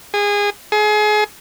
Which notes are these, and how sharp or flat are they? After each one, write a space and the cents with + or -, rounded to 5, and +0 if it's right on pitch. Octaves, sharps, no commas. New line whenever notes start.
G#4 -20
G#4 +30